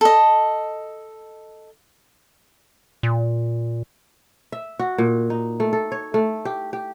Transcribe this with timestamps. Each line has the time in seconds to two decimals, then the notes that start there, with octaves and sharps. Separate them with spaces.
0.01 A4 D#5
3.03 A#2
4.52 E5
4.79 F#4
4.98 A#2
5.30 D#4
5.60 A3
5.73 A4
5.92 C#5
6.14 A3
6.45 G4
6.73 G4